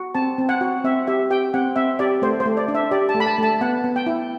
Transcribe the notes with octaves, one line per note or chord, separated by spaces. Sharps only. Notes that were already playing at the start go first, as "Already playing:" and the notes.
Already playing: F#4
C4 A5
C4
F#5
F#4
C4 E5
G4 E5
G4 G5
C4 F#5
C4 E5
G4 D5
A3 C5
C5
A3
D5
D4
E5
G4 D5
A5
A3
B5
A5
A3 A5
B3 F#5
B3
G5
E4